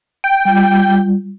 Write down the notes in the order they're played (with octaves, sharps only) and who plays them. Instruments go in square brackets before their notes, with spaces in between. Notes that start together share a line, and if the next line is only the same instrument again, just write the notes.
[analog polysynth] G5
[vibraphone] G3 F4